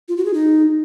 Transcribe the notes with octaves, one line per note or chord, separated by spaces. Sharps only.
F4
F#4
G#4
D#4